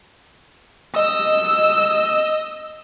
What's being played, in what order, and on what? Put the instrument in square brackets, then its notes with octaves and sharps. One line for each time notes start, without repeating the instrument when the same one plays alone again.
[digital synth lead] D#5 [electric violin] E6